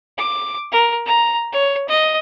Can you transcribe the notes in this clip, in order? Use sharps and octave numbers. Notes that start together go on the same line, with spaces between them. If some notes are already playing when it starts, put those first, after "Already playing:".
D6
A#4
A#5
C#5
D#5